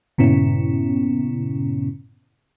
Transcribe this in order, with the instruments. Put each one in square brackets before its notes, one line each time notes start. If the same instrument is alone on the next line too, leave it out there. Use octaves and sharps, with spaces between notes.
[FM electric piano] G2 A#2 C#3 B3 C#4 E4